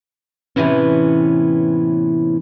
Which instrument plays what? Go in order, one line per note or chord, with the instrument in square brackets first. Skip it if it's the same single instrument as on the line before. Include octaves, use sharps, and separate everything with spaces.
[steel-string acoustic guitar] A2 C3 E3 B3 C#4